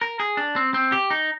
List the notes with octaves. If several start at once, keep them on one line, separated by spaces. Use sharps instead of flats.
A#4
G#4
D4
C4
C4
G4
D#4